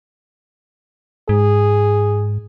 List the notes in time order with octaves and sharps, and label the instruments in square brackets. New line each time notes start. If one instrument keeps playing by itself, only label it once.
[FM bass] G#2 [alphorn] G#4